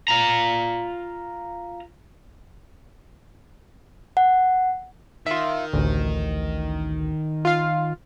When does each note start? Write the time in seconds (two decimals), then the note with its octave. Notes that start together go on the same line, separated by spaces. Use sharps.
0.08 F4 A#5
4.17 F#5
5.26 D#3 F4 E5
5.73 A1 D2
7.45 F4 F5